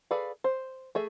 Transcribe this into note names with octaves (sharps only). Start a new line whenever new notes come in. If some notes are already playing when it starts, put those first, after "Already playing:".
G#4 A4 B4 D5 F5
C5
A3 G#4 E5